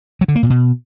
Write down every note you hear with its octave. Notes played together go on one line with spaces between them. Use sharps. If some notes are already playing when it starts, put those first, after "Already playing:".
F#3
D3
A#3
A#2
B2